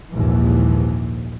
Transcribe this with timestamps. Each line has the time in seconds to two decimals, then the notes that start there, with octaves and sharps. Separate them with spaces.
0.13 A#1 D#2 G#2 E3